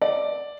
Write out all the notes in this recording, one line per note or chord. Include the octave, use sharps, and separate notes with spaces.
D5